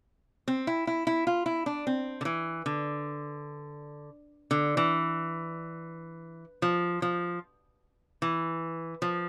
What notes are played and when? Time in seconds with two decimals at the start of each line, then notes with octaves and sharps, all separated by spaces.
0.48 C4
0.67 E4
0.87 E4
1.07 E4
1.27 F4
1.46 E4
1.66 D4
1.87 C4
2.21 D3
2.25 E3
2.66 D3
4.51 D3
4.77 E3
6.62 F3
7.02 F3
8.22 E3
9.02 F3